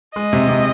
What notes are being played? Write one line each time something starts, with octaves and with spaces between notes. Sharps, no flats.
G#3 D#5
C3
C3